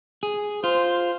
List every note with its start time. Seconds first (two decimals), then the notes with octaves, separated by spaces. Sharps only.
0.23 G#4
0.64 F4 C5